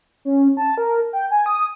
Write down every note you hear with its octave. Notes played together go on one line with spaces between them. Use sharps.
C#4
A5
A#4
G5
G#5
D#6